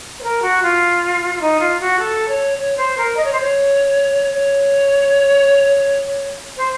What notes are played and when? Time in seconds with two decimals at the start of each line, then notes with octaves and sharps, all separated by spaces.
0.20 C5
0.23 A#4
0.42 F#4
0.63 F4
1.35 F4
1.41 D#4
1.60 F4
1.80 F#4
1.99 A4
2.28 C#5
2.58 C#5
2.77 C5
2.97 A#4
3.17 D#5
3.24 C#5
3.32 C5
3.41 C#5
4.34 C#5
6.57 C5